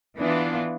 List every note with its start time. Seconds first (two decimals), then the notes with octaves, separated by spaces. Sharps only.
0.17 E3 B3 D4 F4